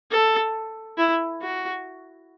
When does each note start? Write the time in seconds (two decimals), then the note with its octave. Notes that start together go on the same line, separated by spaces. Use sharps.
0.11 A4
0.98 E4
1.42 F#4